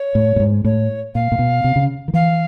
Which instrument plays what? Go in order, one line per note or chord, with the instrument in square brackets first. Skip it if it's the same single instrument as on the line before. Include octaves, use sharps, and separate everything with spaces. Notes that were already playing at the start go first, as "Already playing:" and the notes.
Already playing: [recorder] C#5
[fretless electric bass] A2
A2
G#2
[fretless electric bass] A2 [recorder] C#5
[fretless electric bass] A#2 [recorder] F5
[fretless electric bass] A#2
B2
C3
C#3
D#3
[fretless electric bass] E3 [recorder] F5